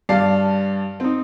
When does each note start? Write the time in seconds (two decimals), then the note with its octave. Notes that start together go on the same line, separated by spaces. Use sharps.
0.09 G2 D5 F5 A5 C7
1.00 C4 D#4